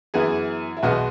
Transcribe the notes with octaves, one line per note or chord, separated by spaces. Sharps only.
F#2 E3 B3 G#4
E4
B1 B2 G#3 B3 F#4